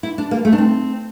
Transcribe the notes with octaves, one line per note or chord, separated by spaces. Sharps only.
E4
D4
A#3
A3
D4
C4